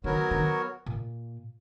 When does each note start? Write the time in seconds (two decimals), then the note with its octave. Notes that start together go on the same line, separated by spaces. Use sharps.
0.04 D#3 F#3 B3 F#4 A#4 C#5
0.31 D#3
0.86 A#2